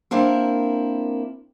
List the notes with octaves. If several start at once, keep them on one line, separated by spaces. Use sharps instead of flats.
A#3 C4 D4 E4 A#4